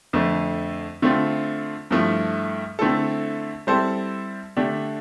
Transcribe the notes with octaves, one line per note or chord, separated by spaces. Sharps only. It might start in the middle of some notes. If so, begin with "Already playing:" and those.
F2 D3 A3
D3 A3 C4 F4
G2 F3 A3 E4
D3 A3 C4 E4 A4
G3 C4 E4 A4 C5
D3 A3 D4 G4